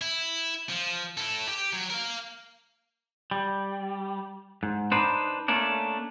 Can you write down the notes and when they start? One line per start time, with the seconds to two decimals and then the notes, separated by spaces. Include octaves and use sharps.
0.01 E4
0.69 F3
1.17 E4 A4
1.48 G4
1.73 F#3
1.90 A#4 F5
3.31 G3
4.63 G#2
4.92 D4 D#4 B4 C5
5.48 A3 A#3 C#4 D4